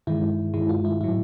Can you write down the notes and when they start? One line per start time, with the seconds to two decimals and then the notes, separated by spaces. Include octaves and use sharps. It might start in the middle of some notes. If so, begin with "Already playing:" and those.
0.07 G2 D#3 G#3 E4
0.54 G2 D#3 G#3 E4
0.69 F4
0.85 E4
1.01 A2 F#3 E4